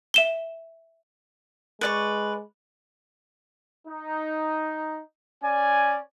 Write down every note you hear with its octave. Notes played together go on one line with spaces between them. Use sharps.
E5 E7 G7
G#3 B4 D5 C#6
D#4
C#4 D5 G#5